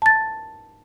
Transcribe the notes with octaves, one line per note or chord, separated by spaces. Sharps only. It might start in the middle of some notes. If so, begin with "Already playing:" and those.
A5 A6